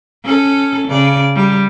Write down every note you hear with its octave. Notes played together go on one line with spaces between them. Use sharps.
C#4 A4
C#3 D5
G3